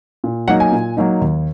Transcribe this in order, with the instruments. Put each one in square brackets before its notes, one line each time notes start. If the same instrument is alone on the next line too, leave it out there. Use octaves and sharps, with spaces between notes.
[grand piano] A#2
F#3 A#3 D#4 F#5
G#5
A#2
F#3 A#3 D#4
D#2